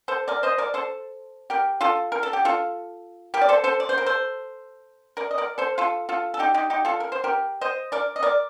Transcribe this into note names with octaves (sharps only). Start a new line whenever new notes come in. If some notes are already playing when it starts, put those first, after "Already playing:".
A4 C5
A#4 D5
C5 D#5
A#4 D5
A4 C5
G4 A#4
F4 A4
A#4
A4
G4
F4 A4
G4 A#4
D5
A4 C5
A4 C5
D5
C5
A#4
A4 C5
A#4 D5
D#5
A#4 D5
A4 C5
F4 A4
F4 A4
A4
D#4 G4
D#4 G4
D#4 G4
F4 A4
A#4
C5
G4 A#4
C5 D#5
A#4 D5
D#5
A#4 D5